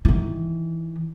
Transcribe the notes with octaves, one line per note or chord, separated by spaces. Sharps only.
D#3 E3